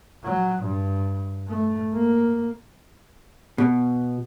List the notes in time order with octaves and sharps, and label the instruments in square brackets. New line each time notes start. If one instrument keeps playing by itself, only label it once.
[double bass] F#3
G2
A3
A#3
[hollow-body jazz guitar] B2